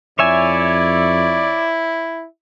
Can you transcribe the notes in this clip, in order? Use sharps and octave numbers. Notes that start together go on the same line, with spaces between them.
F2 E4 C#5 D5 E5 G#5